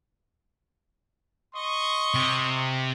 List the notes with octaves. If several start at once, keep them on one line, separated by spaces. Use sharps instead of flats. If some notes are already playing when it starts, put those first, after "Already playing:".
D#5 C6 C#6
C3